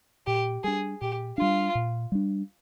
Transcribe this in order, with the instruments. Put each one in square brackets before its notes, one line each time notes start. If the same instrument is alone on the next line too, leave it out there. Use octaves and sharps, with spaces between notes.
[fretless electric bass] A#2 [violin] G4
[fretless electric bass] G3 D4 [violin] G#4
[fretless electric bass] A#2 [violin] G4
[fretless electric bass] G3 D4 [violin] F4
[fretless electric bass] A#2
G3 D4